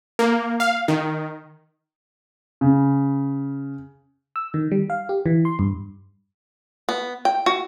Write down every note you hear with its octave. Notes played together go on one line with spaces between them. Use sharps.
A#3
F5
D#3
C#3
E6
D#3
G3
F5
G4
E3
C6
G2
B3
G5
F#4